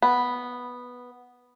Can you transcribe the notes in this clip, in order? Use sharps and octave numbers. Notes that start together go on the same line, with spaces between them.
B3